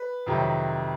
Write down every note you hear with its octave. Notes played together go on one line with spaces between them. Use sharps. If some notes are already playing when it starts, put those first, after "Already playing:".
Already playing: B4
F2 C3 D#3 F#3